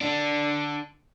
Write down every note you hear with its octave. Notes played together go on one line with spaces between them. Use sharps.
D3 D4